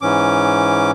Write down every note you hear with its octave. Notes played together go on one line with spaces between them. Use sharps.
G#2 E3 C#4 D6